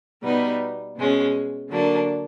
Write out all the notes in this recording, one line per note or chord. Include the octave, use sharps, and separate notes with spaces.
B2 G3 B3 D#4
B2 G#3 C#4
D3 F#3 A#3 D4